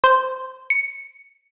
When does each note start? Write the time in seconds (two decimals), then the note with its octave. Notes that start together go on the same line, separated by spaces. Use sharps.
0.04 C5
0.70 C#7